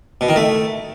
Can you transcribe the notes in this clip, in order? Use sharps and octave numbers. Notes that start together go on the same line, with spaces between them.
B2
D#3
A3